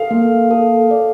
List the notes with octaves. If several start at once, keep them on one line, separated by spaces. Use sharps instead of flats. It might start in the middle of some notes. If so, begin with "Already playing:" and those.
Already playing: A4 F5
A#3
A4
D5